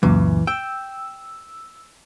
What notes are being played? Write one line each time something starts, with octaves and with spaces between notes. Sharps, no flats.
C#2 F#2 A#2 E3
G5 E6